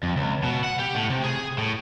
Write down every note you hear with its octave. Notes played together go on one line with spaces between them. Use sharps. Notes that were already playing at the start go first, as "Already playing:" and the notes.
F2
C#2
B2
F#5
G4
A2
C3
G#4
A2